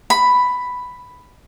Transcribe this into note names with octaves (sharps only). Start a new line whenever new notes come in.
B5